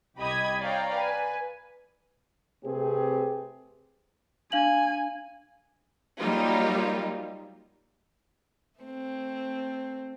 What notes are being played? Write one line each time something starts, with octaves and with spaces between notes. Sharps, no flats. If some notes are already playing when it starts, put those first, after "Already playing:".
C2 G4 D#5 B5 D#6 G#6
C#5 D5 F5 G5 A#5
B4 G#5
C3 A3 C4 G4 G#4 B4
D4 F5 G#5 F#7
F#3 G3 A#3 D#4 F4
A3 C4